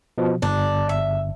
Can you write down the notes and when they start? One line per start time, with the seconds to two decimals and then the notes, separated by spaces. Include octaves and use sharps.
0.18 B2 F3
0.42 G1 D4
0.89 E5